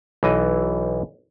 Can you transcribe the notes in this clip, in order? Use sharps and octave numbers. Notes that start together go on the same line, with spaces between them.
B1 E3 D#5